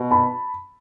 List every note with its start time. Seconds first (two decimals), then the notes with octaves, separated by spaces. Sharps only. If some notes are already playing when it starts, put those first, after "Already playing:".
Already playing: B2
0.11 A5 B5